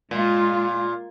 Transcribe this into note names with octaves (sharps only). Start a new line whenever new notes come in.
A#2 G#3 F4